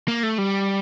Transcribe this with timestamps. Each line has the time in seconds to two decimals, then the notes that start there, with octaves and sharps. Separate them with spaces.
0.08 A#3
0.23 A3
0.38 G3